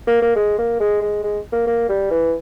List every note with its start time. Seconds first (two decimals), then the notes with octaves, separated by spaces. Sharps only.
0.07 A#3
0.22 A#3
0.36 G#3
0.58 A#3
0.80 G#3
1.02 G#3
1.23 G#3
1.52 A#3
1.67 A#3
1.89 G3
2.11 E3